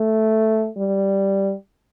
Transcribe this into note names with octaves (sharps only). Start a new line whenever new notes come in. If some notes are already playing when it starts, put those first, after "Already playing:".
Already playing: A3
G3